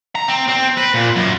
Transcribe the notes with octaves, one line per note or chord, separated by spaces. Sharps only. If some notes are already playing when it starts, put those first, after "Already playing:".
A#5
C4
C4
B4
A#2
F#2